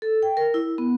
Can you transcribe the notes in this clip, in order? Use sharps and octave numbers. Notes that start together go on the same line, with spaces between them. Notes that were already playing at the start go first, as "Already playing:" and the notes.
A4
G5
A#4
E4
B3